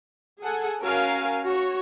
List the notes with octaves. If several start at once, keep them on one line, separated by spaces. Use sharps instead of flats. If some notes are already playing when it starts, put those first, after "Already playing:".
G#4 A4 F#5 G#5
C#4 F#4 A#4 F5 G#5
F#4 C#5